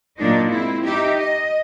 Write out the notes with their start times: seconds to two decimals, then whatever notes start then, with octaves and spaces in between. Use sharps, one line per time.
0.18 A#2 F#3 D4 D#4
0.49 G#3 C4 E4
0.85 D#4 G4 E5
1.18 D#5